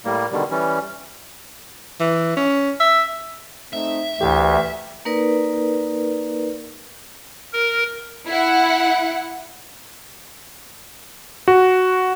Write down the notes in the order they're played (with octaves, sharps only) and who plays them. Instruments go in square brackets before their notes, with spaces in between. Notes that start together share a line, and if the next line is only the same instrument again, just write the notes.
[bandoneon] A2 G3 A#3
B2 D3 D#3 G3
E3 G3 C#4
[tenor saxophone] E3
C#4
E5
[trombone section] A3 C4 D#4 [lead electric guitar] E5
[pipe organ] D2 [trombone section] E3 [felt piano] G4
[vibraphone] A#3 D#4 A#4 B4 D5
[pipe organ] A#4
[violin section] E4 F#5
[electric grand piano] F#4